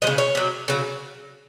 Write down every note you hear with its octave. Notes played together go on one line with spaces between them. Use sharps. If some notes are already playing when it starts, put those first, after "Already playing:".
F3 G#3 D#5
C#3
C#5
C3 F#3
C#3 F#3